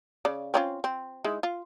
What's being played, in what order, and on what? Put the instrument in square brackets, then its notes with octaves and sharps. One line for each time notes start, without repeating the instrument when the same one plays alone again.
[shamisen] C#3 D5
C4 C#4 F4
C4
G#3 D#4 E4
F4